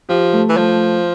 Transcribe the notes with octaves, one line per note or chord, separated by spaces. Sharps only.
F3 G4
A3
E3
F3 A3